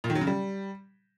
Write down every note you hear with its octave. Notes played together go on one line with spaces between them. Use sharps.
A#2
D#3
F#3
C#3
G3